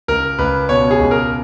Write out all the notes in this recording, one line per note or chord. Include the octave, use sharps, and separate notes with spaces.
C#2 A#4
C#2 B4
B2 C#5
G#4
C#2
A#4